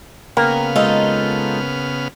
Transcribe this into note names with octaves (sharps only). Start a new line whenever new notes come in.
C#3 A#3 B3 A#4 G5 F6
G#3 D#4 F4 A4